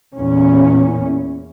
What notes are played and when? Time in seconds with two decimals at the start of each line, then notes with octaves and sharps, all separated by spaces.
0.15 E2 A#2 C#4